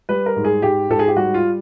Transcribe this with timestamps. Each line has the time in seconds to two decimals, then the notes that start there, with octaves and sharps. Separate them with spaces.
0.09 G3 B4
0.26 A#4
0.36 G#2
0.44 G#4
0.62 G#2 G4
0.89 G#2 A4
0.99 G#4
1.08 G4
1.16 G3 F#4
1.34 F4